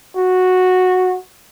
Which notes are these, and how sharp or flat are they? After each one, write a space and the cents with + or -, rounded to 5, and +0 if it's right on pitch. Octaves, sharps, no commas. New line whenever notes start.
F#4 -10